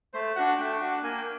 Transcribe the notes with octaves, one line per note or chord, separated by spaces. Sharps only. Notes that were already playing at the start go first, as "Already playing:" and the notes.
A3 C5
D4 F#4 F#5
A3 G5
D4 F#4
A#3 G#5
G5